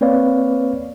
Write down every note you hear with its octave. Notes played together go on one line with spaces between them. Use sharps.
A#3 C4 B4 C#5 D5 F5